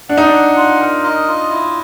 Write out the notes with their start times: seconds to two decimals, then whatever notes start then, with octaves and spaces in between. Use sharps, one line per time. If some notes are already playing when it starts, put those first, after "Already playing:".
0.09 D4 F#5
0.18 D#4
0.26 D4
0.33 F#5
0.56 F4
0.80 A#4
1.04 D#5
1.28 F4
1.51 E4